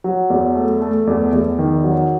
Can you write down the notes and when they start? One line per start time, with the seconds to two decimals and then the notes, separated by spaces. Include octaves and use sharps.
0.04 F#3
0.30 E2
0.55 A3
0.81 A3
1.07 E2
1.33 E2
1.58 D#3
1.84 F#3